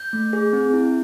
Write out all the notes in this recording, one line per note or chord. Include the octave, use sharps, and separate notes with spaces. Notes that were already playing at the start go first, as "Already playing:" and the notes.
Already playing: G6
A3
G#4
C4
E4